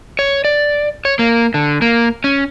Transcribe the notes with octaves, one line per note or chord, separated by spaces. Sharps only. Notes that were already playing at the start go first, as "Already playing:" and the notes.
C#5
D5
C#5
A#3
D3
A#3
C#4